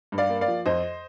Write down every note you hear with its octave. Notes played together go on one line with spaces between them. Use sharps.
G2
D5 F5
A#3
D5 F5
F3
F2 C5 D#5